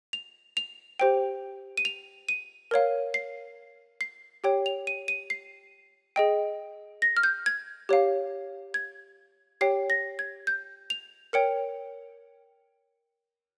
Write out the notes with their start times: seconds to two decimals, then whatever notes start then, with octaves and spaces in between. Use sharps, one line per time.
0.13 F7
0.57 F7
1.00 G4 C5 G5
1.77 D#7
1.85 F7
2.28 D#7
2.71 A#4 C#5 F5
3.14 C7
4.01 C7
4.44 G4 C#5 G5
4.66 F7
4.87 D#7
5.08 D#7
5.30 C7
6.16 G#4 D#5 G5
7.02 A#6
7.17 F6
7.23 G6
7.46 G#6
7.89 G4 C#5 F5
8.74 G#6
9.61 G4 C#5 G5 C7
9.90 A#6
10.19 G#6
10.47 G6
10.90 F7
11.33 A#4 C#5 G5 C#7